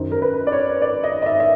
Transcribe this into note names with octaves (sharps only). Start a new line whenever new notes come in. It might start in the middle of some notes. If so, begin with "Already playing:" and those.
Already playing: F#2 D#3 C5
A#4
B4
D5
C#5
D5
D#5
D#5
E5
E5